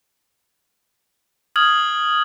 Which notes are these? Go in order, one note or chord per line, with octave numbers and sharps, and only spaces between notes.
D#6 F6 G#6 F#7